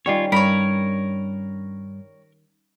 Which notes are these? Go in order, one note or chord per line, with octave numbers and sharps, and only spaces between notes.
D#3 G3 C#4 F4 C#5
G2 A#4 C#5 B5